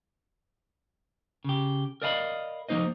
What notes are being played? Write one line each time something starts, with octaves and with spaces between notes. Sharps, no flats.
C#3 G4
A#4 D5 D#5 F5 A5 B5
F3 A#3 D#4 C5 D#5